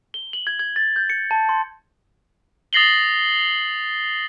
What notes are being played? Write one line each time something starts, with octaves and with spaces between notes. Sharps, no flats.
G7
F#7
G#6
G#6
A6
G6
C#7
A5
C6
D#6 A6 A#6 C7 F#7 G7